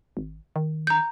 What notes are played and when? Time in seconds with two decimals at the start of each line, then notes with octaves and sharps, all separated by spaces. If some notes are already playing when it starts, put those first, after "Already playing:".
0.17 G#1
0.56 D#3
0.87 A#5 G6